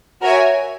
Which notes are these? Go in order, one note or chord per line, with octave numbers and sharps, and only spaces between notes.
F#4 A#4 C#5 E5 G#5